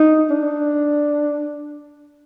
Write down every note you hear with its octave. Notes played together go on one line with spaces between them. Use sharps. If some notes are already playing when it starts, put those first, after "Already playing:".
Already playing: D#4
D4